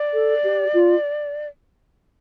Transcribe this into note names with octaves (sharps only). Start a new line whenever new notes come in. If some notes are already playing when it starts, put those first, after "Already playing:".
Already playing: D5
A4
G4
F4